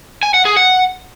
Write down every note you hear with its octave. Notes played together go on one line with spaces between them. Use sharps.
G#5
F#5
G#4
F#5